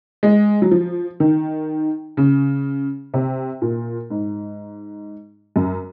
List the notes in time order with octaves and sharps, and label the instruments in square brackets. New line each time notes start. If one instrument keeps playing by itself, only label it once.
[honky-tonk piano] G#3
F#3
F3
D#3
C#3
C3
A#2
G#2
F#2